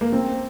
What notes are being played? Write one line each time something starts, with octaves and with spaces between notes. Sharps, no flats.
A#3
C4